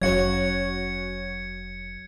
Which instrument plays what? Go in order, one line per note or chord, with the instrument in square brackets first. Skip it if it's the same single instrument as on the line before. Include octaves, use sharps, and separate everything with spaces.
[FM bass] F1 [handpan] F#3 [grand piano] C#4 F#4 C#5 [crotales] G#6 C#7